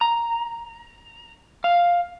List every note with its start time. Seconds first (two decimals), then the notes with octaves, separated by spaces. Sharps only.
0.01 A#5
1.64 F5